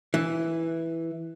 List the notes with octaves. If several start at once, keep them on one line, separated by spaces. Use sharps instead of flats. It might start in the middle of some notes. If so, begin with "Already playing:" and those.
E3